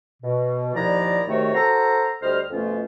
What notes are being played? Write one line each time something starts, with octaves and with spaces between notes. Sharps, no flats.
B2
D#2 A#2 F3 E4 D5 A#5
G#2 C3 D#3 A3 F#4 C#5
F#4 A4 C5 A#5
D2 G3 C5 D#5 F6
F2 B2 A3 C#4 F4